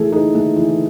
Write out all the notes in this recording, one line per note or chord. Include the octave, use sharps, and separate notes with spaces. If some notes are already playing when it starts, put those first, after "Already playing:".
Already playing: E3 A3 G#4 A4
D#4 G#4
A3
E3